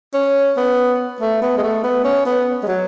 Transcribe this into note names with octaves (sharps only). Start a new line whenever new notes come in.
C#4
B3
A3
B3
G#3
A3
B3
C#4
B3
G#3
F#3